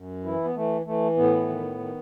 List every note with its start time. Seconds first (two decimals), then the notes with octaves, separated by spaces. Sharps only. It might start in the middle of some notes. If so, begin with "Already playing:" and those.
Already playing: F#2
0.24 E3 E4
0.44 B3
0.55 E3 A3
0.86 E3 A3
1.16 A2 B3
1.48 D#3
1.78 D#3